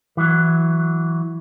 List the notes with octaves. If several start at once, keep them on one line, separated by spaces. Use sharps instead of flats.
E3 F#3